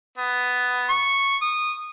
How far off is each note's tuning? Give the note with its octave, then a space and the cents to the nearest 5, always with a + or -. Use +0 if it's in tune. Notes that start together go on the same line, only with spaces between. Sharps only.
B3 +10
C#6 -5
D#6 -15